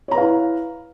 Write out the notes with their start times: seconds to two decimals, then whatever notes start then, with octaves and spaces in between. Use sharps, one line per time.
0.08 C#5
0.11 A#5
0.15 B4
0.18 F5
0.21 E4